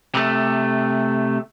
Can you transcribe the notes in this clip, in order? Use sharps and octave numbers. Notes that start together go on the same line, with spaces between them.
C3 A3